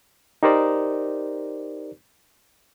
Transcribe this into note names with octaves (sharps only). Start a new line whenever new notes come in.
D#4 G4 A#4 C5 D5